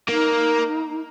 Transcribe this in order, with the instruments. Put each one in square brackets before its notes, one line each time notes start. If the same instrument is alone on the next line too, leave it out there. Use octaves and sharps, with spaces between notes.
[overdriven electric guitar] A#3 [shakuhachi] D#4